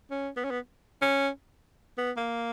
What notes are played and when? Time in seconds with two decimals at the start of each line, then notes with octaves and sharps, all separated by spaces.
0.11 C#4
0.37 B3
0.44 C#4
0.51 B3
1.02 C#4
1.98 B3
2.17 A#3